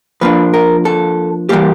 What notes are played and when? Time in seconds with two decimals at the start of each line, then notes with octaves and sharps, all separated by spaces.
0.21 F3 A#3 D4 B4
0.54 A#4
0.85 A4
1.49 E3 G3 A#3 G4